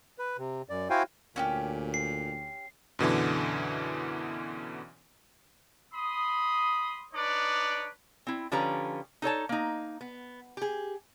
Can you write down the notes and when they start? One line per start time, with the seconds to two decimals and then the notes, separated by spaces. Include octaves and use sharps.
0.19 B4
0.38 C3
0.69 F#2 D5
0.90 E4 F#4 C5 F5 G5 G#5
1.36 D2 A#2 C#4 F#4 G4
1.94 C7
2.99 F#2 B2 D3 E3
5.93 B5 C6 D#6
7.13 D4 D#4 B4 C#5 D5
8.27 C4 E4
8.52 D3 F3 C#4 G4 B4 A#5
9.22 D#4 A4 C#5 A5
9.49 A#3 D#4
10.01 B3
10.57 G4 G#4